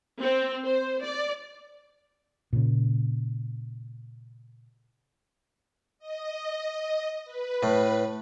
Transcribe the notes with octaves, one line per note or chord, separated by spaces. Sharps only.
C4
C5
D5
A#2 C#3
D#5
B4
A2